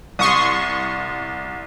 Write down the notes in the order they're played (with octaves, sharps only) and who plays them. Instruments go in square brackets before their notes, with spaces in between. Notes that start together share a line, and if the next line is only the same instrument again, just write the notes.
[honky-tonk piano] C2 [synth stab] C6 C#6 D#6